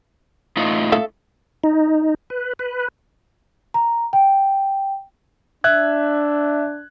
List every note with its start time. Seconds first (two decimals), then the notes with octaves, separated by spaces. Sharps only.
0.57 A2 D#4 F4
0.92 A4 E5 F5
1.64 D#4
2.30 B4
2.59 B4
3.74 A#5
4.13 G5
5.64 D4 E5 F#6 G#6